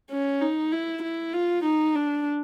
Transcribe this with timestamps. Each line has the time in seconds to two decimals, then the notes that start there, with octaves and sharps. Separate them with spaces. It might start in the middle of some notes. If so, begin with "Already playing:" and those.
0.11 C#4
0.41 D#4
0.72 E4
1.03 E4
1.33 F4
1.64 D#4
1.95 D4